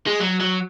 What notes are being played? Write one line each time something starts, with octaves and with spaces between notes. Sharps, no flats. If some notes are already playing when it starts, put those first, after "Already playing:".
G#3
F#3
F#3